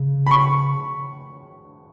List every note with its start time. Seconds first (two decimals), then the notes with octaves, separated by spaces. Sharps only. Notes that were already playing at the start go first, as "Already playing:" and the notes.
Already playing: C#3
0.26 B5
0.31 C#6